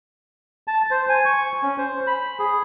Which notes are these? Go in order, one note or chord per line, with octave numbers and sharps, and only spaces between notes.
A5
C5
G#5
C#6
C#4
C5
B5
G#4